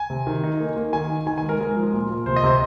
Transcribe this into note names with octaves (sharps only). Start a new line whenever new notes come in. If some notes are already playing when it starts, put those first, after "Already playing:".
Already playing: G#5
C3
D#3
D#4
A#3
A#3
D#3 G#5
D#4
D#3 G#5
G#5
G#3
A#4
G#3 A#4
F3
A#2
A#2
C3 C5
D#5
C3 C5